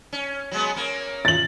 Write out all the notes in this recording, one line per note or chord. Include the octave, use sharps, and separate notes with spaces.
C#4
F#3 G#3 B3
A#3 C#4
A6 F#7